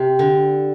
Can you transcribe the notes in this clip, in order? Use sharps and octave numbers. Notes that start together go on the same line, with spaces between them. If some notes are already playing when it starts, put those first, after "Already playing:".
Already playing: C3
D3